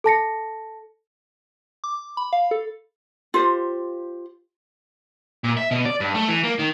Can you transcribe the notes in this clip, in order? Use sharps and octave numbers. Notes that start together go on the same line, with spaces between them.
A4 A5 A#6 C#7
D6
B5
F5
A4
F4 G4 C5
A#2
E5
B2
D5
G2
A3
E3
A#3
D#3